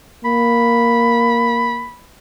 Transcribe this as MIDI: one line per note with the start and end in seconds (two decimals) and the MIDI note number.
0.25 1.91 58
0.25 2.06 83